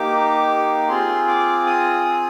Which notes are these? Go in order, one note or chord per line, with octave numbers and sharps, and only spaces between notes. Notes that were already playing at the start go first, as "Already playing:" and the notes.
Already playing: A#3 D#4 G4 D6
C4 F4 G#4 C6
D6
D#6
D#6